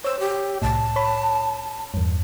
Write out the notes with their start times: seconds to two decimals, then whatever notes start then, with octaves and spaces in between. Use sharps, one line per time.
0.04 C5 C#5 E6
0.20 G4
0.62 C2 A2 A5
0.96 C#5 B5
1.94 E2 G2